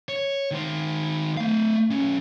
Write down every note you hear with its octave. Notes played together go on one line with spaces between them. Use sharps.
C#5
D#3 C5
A3 F5
B1 C#4